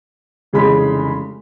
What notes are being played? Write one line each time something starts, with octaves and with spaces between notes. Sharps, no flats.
F1 C#3 E3 G#3 B5